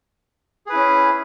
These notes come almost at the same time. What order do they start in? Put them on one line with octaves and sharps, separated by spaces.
G#4 B4 E4 C#4